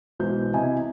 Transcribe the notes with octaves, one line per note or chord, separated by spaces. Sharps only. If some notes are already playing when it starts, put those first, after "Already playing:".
B1 E3 G#3 C5 G6
C3 E4 D#5 G#5